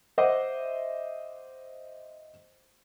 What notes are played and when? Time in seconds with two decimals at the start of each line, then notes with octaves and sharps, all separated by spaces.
0.18 C5 D#5 E5 F#5 D6